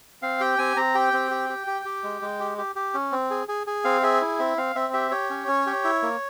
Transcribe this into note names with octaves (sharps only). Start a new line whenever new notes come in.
C4 F5
G4 G5
C4 G#5
C4 A#5
G4 G5
C4
G4
G4
G4
G4
G#3
G#3
G4
G4
G4
C#4
C4
G#4
G#4
G#4
C4 F5
G#4 E5
E4
C4 E5
C4 F5
C4 E5
G4 E5
G4 C#5
C#4
C#4
G4
E4
A#3